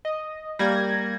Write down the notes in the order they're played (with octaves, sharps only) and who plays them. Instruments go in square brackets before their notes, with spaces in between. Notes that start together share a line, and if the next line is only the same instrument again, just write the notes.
[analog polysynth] D#5
[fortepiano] G3 [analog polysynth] A#3 G#6 A#6